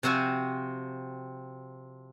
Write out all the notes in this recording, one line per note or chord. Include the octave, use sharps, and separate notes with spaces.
C3 F3 C4 F#4 C5 G#5